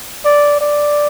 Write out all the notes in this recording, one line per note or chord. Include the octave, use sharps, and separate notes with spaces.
D5
D5